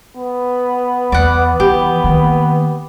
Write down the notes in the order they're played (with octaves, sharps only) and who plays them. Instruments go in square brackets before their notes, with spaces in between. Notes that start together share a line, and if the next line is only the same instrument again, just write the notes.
[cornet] B3
[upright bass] E2 [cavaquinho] D5 F#5
[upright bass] E3 [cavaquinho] G4
[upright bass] D#3 A#3